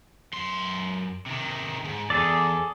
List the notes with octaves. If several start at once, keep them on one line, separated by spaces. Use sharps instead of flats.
F#2 C6
C3 D#3
C#2 G#2
E2 G#4 A4 D5